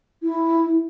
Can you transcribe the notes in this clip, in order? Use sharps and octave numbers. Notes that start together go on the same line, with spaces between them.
E4